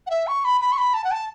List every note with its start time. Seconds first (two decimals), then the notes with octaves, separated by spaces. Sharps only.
0.07 F#5
0.10 E5
0.27 C#6
0.45 B5
0.61 B5
0.72 C#6
0.78 B5
0.94 A5
1.04 F#5
1.11 A5